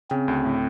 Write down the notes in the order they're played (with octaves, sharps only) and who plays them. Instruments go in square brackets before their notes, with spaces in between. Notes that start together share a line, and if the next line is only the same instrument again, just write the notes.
[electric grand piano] C#3 [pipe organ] C4
[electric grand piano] D2
A2